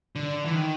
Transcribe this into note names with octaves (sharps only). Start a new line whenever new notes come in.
D3
E3
D#3